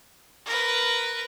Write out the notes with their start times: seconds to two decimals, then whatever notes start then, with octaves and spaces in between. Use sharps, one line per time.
0.46 A#4 B4